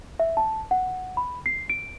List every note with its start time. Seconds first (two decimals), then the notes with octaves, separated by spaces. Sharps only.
0.20 E5
0.37 A5
0.71 F#5
1.17 B5
1.46 C7
1.70 D7